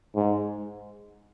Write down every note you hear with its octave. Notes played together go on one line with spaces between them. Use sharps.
G#2